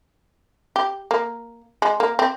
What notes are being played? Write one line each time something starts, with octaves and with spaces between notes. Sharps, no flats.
G4
A#3
G#3
A#3
C4